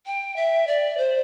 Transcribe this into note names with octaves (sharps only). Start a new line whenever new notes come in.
G5
E5
D5
C5